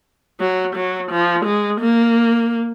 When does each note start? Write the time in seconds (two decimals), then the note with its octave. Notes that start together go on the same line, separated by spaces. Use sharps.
0.40 F#3
0.76 F#3
1.11 F3
1.46 G#3
1.81 A#3